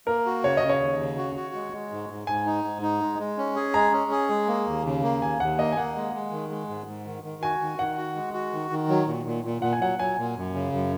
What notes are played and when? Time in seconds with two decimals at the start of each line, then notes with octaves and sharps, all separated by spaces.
0.07 A#3 A#4
0.26 F#4
0.44 C#3 C#5
0.57 D#5
0.63 C#3
0.69 C#5
0.80 D#2
0.99 C#3
1.17 F#4
1.36 F#4
1.54 G#3
1.73 G#3
1.91 G#2
2.09 G#2
2.27 G#2 G#5
2.46 D#4
2.64 G#2
2.82 D#4
3.01 G#3
3.19 G#3
3.38 C#4
3.56 G#4
3.74 G#3 A#5
3.92 C#4
4.11 G#4
4.30 G#3
4.48 A#3
4.67 D#2
4.85 C#3
5.03 A#3
5.22 D#2 G#5
5.40 D#2 F#5
5.58 A#3 D#5
5.72 G#5
5.77 A#3 F#5
5.96 G#3
6.13 G#3
6.32 D#3
6.51 G#3
6.69 G#2
6.87 G#2
7.06 D#3
7.24 D#3
7.42 F#4 G#5
7.61 D#3
7.78 D#3 F#5
7.97 F#4
8.16 G#3
8.34 F#4
8.52 D#3
8.71 D#3
8.89 F#3
9.07 A#2
9.26 A#2
9.44 A#2
9.62 A#2 F#5
9.73 G#5
9.81 F#3 F#5
9.99 F#3 G#5
10.18 A#2
10.37 F#2
10.54 C#3
10.72 F#2